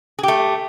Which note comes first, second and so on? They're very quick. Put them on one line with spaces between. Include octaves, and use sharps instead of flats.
G#4 G4 A3